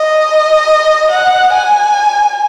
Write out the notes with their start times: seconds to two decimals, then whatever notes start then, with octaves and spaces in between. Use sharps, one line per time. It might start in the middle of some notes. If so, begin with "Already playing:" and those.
Already playing: D#5
1.12 F#5
1.53 G#5